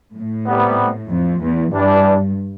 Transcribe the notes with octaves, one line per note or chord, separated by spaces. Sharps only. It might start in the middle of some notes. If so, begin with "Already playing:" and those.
A2
C3 G3 B3
F2
E2
G2 E3 G3 D4